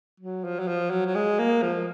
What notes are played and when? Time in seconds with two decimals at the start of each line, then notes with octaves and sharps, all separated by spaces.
0.20 F#3
0.45 F3
0.59 F#3
0.68 F3
0.91 F#3
1.06 F#3
1.15 G#3
1.39 A#3
1.62 F3